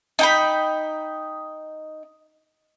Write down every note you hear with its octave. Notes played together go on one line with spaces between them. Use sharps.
D#4 G5 B5